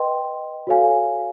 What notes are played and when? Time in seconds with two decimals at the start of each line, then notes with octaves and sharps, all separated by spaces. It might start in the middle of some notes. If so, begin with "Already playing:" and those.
Already playing: B4 D#5 G5 C6
0.67 F#4 A4 C#5 F5 G#5